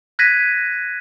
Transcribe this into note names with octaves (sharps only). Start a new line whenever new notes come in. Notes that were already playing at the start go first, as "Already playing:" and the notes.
F#6 G#6 A#6 B6 D#7